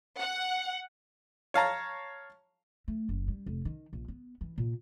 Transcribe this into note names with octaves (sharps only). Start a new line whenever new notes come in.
F#5
C#5 F5 A5 A#5
A3
F#1
G3
F1
D#3
A#1
B3
E3
A#2